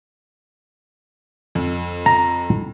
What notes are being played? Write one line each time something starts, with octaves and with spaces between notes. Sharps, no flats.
F2
A#5